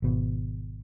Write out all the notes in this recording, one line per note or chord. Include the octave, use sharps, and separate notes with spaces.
G#1 B2